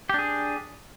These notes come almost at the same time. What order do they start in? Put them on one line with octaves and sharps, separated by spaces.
G4 D4 G#4